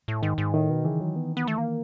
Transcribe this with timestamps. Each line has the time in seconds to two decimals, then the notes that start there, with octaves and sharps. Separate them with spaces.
0.08 A2
0.22 G#2 D#3
0.38 G#2
0.54 A2 D#3
0.70 B2
0.85 C#3 E3
1.00 F#3
1.16 B3
1.37 B3
1.47 A3
1.58 A#3